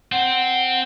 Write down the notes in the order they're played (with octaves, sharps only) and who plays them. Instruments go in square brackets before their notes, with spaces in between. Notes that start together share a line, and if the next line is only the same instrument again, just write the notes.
[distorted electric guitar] C4 [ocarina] F#5